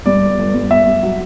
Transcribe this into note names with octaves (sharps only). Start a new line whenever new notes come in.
G2 D5
G1
G1
G2
G1 E5
G2
F#3